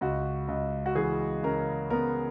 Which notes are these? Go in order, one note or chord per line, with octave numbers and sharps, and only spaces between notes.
C#2 F#4
C#2
F#4
E3 G#4
C#3 A#4
B3 A#4